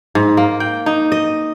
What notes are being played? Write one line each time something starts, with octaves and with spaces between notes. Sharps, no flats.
G#2
A#3
G5
D#4
D#5